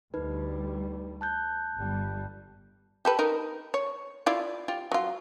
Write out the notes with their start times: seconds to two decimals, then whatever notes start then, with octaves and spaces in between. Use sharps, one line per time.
0.14 D2 G3 D#4 B4
1.21 A5 F#6 G6
1.76 G1 G3
3.05 G4 A4 B4
3.19 D#4 A#4
3.74 C#5
4.26 E4 F4 D5
4.68 F4 G4
4.92 F#3 F4